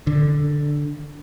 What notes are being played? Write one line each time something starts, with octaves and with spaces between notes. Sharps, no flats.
D3